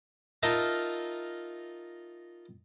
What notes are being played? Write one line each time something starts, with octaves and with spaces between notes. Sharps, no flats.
D#4 F4 A#4 D#5 E5 A5